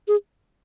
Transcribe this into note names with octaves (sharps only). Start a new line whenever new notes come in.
G#4